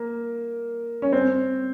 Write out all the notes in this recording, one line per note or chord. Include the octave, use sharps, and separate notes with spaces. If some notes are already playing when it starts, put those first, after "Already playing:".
Already playing: A#3
C#4
C4